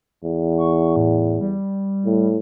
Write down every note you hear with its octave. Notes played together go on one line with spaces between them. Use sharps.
E2
C#6
A2
G3
A2